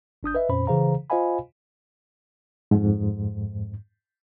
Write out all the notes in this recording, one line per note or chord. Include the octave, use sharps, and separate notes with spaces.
G#1 D4 D#6 G6
B4 D#5 E5
F2 A#2 C#4 C5 B5
C#3 E3 G#4 C5 F5 A#5
F4 C5 D#5 F5 G#5 B5
F2 G#2